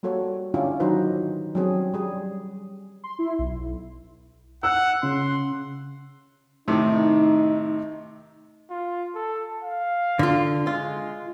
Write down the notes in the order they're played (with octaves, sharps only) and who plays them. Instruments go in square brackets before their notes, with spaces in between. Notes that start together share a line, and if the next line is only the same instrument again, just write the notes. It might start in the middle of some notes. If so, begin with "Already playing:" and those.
[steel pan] G3 A#3 F#4 A4 C#5
D3 C#4 D4 E4 F4 G4
D#3 F#3 D#4 F#4 B4 C5
F#3 G3 C4 C#4 G#4
G3 G#4
[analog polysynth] C6
E4
B1
[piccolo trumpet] F#5 [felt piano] E6 F#6
[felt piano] C#3 [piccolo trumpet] C6
[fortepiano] A2 C3 D#3 [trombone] D#4
[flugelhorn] F4
A4
F5
[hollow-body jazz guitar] D3 F4
[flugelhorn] G#3 [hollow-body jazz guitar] F4